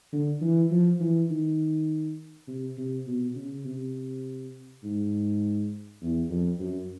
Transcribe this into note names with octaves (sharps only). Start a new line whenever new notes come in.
D3
E3
F3
E3
D#3
C3
C3
B2
C#3
C3
G#2
E2
F2
F#2